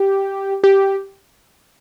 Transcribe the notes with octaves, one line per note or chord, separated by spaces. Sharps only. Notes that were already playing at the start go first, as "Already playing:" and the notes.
Already playing: G4
G4